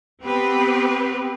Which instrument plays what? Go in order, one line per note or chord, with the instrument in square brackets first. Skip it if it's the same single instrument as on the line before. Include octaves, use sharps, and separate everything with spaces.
[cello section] B3 C4 G4 B4